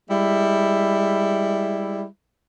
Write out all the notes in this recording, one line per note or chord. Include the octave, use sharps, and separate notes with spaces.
G3 G#3 E4